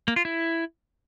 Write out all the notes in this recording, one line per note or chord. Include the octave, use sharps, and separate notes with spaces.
A#3
F4
E4